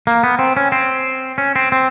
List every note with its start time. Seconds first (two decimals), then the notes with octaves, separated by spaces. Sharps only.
0.07 A#3
0.23 B3
0.39 C4
0.57 C#4
0.72 C4
1.38 C#4
1.56 C4
1.72 C4